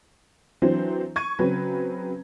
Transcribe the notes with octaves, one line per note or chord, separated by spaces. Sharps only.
E3 F#3 C4 D4 C5
C#6 G#6 D#7
C#3 F#3 C4 C#4 B4